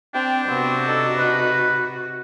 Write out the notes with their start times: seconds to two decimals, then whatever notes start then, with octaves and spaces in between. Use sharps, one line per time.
0.14 C4 D4 G5
0.48 C3 B3 C4 F#4
0.87 D#4 A4
1.17 B4